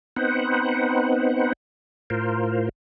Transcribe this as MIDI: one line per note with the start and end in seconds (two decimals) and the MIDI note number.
0.16 1.53 59
0.16 1.53 60
0.16 1.53 63
0.16 1.53 71
0.16 1.53 72
0.16 1.53 78
2.10 2.69 45
2.10 2.69 65
2.10 2.69 70
2.10 2.69 72